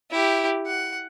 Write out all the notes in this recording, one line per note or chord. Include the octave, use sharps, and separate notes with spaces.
E4 G4
F#5